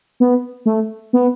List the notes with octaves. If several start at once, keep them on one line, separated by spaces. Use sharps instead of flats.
B3
A3
B3